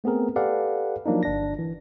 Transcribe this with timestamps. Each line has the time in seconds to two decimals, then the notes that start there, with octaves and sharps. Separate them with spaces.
0.04 A3 B3 C4 G#4 A#4
0.36 G4 A4 B4 D5 F5 F#5
1.06 F3 F#3 A#3 D4 D#4
1.23 G1 D4 A#6
1.59 E3